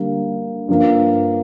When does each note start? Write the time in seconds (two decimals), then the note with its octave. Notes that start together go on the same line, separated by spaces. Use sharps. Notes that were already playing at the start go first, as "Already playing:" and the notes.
Already playing: D3 G3 A#3
0.68 G2 F3 A#3